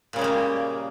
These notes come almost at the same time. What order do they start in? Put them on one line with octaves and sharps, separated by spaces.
A#2 C#3 G#3 G3 A#3